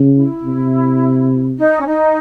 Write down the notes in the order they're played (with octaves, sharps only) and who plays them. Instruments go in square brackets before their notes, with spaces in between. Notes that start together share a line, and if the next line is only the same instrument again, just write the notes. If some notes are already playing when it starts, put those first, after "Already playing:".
Already playing: [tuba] C#3
[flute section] E4
[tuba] C3
[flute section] D#4
C#4
D#4